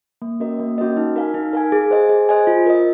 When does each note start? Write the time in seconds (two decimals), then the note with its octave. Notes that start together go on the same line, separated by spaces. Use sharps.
0.22 A#3
0.40 C#4 F#4 A#4 D#5
0.59 A#3
0.78 C#4 F#4 A#4 D#5
0.97 D#4
1.16 A#4 F5 G#5
1.34 D#4
1.53 A#4 F5 G#5
1.72 G#4
1.91 C5 D#5 G#5
2.09 G#4
2.29 C5 D#5 G#5
2.47 F4
2.66 A#4 D#5